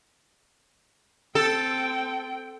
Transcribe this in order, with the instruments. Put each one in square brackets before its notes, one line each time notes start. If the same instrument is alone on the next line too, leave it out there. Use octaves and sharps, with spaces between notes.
[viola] C4 G5 [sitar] A4